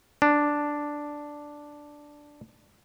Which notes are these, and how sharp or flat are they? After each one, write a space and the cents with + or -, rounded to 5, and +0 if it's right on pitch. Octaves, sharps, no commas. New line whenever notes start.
D4 +0